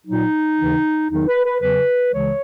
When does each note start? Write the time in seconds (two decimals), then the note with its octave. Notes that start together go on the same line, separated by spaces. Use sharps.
0.06 A#2 F#3 D#4
0.58 D#2 C#3 E3
1.09 E2 D#3 F#3 D#4
1.26 B4
1.44 B4
1.60 E2 C#3 F#3 B4
2.12 C#2 C#3 E3 G#3 C#5